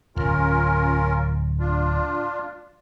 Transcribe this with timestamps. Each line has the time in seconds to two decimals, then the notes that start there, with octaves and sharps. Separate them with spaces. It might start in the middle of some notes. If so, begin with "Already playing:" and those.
0.16 D1 G#1 C#4 F4 A#4
1.59 D4 F4